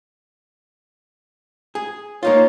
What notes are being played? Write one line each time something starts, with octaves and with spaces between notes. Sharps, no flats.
G#4
A#3 D#4 F4 C#5